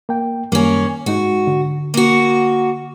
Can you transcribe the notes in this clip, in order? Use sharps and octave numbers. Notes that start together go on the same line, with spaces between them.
A#3 G5
F#2 D#3 G3 A#3 C#4
G#2 G#3 D#4 F#4
D3
A#3 F#4